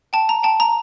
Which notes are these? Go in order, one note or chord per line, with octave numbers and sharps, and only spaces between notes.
G5 A5
A#5
G5 A5
A#5